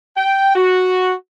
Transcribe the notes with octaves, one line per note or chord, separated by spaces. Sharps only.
G5
F#4